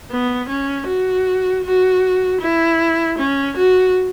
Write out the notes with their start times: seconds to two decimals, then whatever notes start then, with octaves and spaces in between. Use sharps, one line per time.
0.11 B3
0.49 C#4
0.88 F#4
1.65 F#4
2.41 E4
3.19 C#4
3.57 F#4